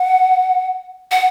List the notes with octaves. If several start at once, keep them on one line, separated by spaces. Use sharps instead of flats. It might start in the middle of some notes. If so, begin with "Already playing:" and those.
Already playing: F#5
F#5